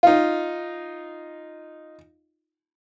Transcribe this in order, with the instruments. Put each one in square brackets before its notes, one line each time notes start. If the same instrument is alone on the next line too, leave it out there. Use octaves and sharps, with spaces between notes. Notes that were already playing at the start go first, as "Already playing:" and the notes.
[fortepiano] D#4 F4